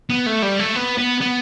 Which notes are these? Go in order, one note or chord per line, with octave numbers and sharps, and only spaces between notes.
B3
A3
G3
A3
B3
B3
B3